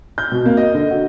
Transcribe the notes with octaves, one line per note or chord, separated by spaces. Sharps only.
G6
B2
A#3
D#5
D3
F#4